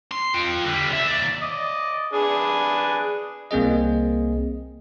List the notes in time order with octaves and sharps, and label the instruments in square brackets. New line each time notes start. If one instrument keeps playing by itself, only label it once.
[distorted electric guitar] C6
F4 G5
D3 G3
D3 E5
D#2 D5
[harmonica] D5 D#5
D4 G#4 B4
[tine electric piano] C2 A#3 C4 G#4 D#5